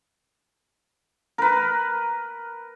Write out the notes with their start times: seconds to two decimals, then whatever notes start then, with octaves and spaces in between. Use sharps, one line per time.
1.38 A#4 B4